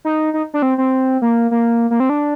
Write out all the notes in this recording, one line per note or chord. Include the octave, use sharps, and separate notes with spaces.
D#4
D#4
D4
C4
C4
A#3
A#3
A#3
C4
D4